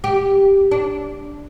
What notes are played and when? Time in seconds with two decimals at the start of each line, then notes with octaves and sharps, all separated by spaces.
0.04 G4
0.71 D4